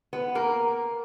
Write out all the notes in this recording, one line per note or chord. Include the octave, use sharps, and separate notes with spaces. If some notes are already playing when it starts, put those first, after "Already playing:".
B3 B4
A#3 A#4